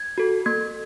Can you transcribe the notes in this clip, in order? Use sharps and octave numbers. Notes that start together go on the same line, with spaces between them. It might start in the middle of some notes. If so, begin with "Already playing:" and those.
Already playing: G#6
F#4 A4
A#3 G#6